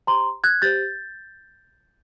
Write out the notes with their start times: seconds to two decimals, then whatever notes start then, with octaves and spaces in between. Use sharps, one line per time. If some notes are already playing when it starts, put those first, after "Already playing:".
0.07 G4 C5 A#5 C6
0.44 F#6 G#6
0.62 G4 C5 G6 A6